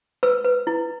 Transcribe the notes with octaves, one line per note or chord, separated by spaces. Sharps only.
B4 E6
B4
E4